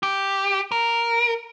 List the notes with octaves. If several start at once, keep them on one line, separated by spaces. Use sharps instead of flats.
G4
A#4